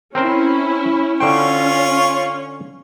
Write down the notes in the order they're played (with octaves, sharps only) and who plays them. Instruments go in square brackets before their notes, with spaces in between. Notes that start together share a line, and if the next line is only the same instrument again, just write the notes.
[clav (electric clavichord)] C4 A#4 C5 [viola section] C#4 E4
[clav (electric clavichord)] D3 C5 G5 [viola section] C#4 [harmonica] F4 C#6